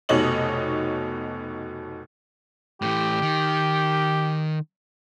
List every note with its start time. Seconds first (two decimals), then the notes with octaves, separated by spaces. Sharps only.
0.09 F1 B2 D#4 C#5 D#5 F#7
2.82 A2 E3 G4
3.22 D#3